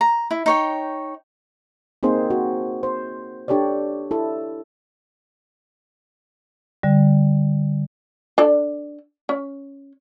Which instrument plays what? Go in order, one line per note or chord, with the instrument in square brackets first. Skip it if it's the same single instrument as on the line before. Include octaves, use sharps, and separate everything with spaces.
[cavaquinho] A#5
E4
D#4 C#5 G5
[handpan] A#3 C4 D#4 G#4 C5
F#4
C5
D4 G4 A4 C#5 D5
E4 A4
[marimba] D3 G3
[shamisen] D4 A4 D5
C#4